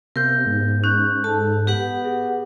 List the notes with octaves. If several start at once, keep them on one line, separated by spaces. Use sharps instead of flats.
C3 B3 A#4 G6
G#2
C#4 F#6 G6
A4 A5
B3 G4 B4 F#5
G#4